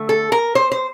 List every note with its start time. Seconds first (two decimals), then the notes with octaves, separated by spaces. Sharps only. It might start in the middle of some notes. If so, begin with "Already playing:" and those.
Already playing: D3 A3
0.09 A4
0.32 A#4
0.55 C5
0.72 C5